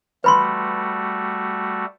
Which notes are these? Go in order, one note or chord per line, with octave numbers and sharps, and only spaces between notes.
G3 A3 F#4 B4 B5 C6